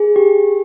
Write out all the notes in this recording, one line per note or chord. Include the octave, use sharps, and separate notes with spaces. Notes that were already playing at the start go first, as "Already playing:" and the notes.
Already playing: G#4
G4